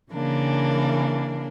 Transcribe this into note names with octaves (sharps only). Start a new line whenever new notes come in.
C#3 E3 A#3 D4 A#4